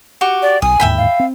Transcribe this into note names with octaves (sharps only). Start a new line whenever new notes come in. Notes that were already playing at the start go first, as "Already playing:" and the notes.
F#4 G4 C#6
D5
B1 G#5 D#6
D1 D#2 G#2 E5 G5 B5
F5
C4